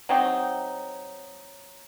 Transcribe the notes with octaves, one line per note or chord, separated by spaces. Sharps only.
F#3 C4 D#4